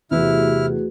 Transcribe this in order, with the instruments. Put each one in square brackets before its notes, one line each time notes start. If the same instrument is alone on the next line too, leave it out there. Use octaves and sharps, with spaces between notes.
[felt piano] E2 [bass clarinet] C3 [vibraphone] A3 F#4 G#4 [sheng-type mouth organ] E4 F6